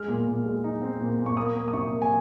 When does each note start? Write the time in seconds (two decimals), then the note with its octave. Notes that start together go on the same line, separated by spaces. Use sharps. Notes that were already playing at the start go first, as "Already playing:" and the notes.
Already playing: G#3 F6
0.08 A#2
0.27 A#2
0.45 G#3
0.64 D#4
0.82 C4
1.00 A#2
1.19 A#2
1.26 C#6
1.37 A#3 D#6
1.55 A#3
1.68 D#6
1.73 C3 C#6
1.91 A#3
2.02 G#5